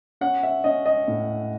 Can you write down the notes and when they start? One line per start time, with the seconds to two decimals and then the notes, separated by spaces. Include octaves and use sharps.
0.21 C#4 F#5
0.43 E5
0.64 C#4 D#5
0.86 D#5
1.08 A2